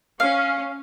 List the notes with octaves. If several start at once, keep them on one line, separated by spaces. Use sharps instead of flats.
C#4 F5